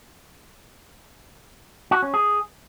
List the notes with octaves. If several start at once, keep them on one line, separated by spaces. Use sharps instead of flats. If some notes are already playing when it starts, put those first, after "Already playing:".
F#4
C#4
G#4